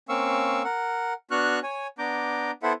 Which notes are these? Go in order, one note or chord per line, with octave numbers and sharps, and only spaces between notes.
A#3 C4 C#4 F5 C#6 E6
A#4 F#5
B3 D4 F#4 C#6 F6 F#6
C#5 G#5
B3 D4 A#5 D6 G6
B3 E4 A4 C5 E5 F#5